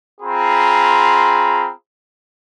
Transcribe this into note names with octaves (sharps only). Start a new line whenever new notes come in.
C4 F4 G#4 A#5 B5